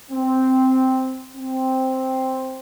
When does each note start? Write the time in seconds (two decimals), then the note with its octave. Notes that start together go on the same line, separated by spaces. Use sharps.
0.11 C4
1.36 C4